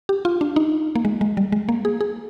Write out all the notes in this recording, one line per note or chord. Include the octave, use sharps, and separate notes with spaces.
G4
F4
D4
D#4
A#3
G#3
G#3
G3
G#3
A#3
G#4
G#4